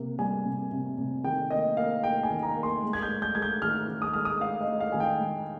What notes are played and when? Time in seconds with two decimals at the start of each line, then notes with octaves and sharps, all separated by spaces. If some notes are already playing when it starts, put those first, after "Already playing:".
Already playing: C3 A#3
0.19 G3 G#5
0.45 C3
0.72 C3
0.98 C3
1.24 D#3 G5
1.51 A#3 D#5
1.77 A#3 F5
2.03 A#3 G5
2.23 G#5
2.30 D#3
2.43 A#5
2.56 A#3
2.63 C6
2.83 G#3
2.93 G#6
3.03 G6
3.09 G#3
3.22 G6
3.35 G#3 G#6
3.42 G6
3.62 D#3 F6
3.88 D#3
4.02 D#6
4.13 G#3 F6
4.25 D#6
4.41 G#3 F5
4.61 D#5
4.67 G#3
4.80 F5
4.92 D#3 G#5
5.00 G5
5.20 G#3